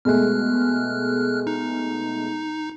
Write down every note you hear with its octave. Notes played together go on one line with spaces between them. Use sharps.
B2 G#3 A3 F6 F#6
D#4